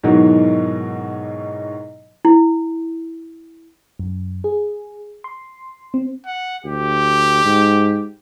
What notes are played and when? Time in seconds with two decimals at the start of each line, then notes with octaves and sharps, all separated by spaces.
0.03 G#2 B2 D#3 E3 F#3
2.25 E4
3.99 F#2
4.44 G#4
5.24 C6
5.94 C4
6.26 F#5
6.65 D2 G4
7.44 G#2